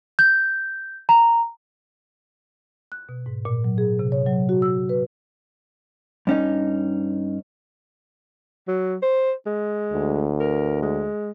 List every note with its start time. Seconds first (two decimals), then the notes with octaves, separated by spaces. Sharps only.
0.19 G6
1.09 A#5
2.92 F#6
3.09 B2
3.26 G#2
3.45 A#2
3.64 F#3
3.78 G#4
3.99 C3
4.12 C#5
4.26 F#3
4.49 F#4
4.62 E6
4.89 B4
6.27 G2 C#4 D#4
8.68 F#3
9.02 C5
9.46 G#3
9.92 D2
10.40 A#4
10.82 G#3